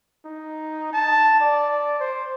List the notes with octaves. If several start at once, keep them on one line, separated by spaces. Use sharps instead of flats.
D#4
A5
D5
C5